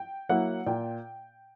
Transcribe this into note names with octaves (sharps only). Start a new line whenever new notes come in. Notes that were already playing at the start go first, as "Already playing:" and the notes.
Already playing: G5
F#3 A#3 E4 F#5
A#2 G5